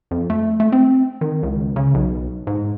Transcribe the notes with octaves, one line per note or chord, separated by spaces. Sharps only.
F2
A3
A3
C4
D#3
C#2
C#3
B1
G#2